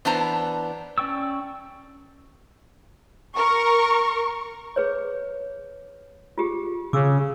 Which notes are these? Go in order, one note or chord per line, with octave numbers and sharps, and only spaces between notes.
E3 B3 D4 C5 A5 A#5
C#4 D5 G5 C#6 E6
A#4 C#6
G#4 B4 C#5
F4 G4 G#4
C#3 D6 E6